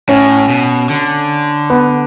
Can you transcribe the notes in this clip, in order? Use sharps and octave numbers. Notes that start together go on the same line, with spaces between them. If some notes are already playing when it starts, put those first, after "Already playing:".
A2 C#4
B2
D3
B3